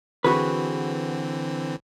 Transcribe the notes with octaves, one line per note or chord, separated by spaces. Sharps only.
D3 E3 C4 F#4 G#4 B4